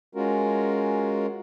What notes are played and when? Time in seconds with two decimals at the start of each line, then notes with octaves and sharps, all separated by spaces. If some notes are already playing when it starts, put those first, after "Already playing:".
0.15 G#3 C#4 F4 F#4 A#4